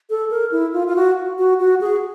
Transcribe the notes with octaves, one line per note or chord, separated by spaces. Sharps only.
A4
A#4
E4
F4
F4
F#4
F#4
F#4
G#4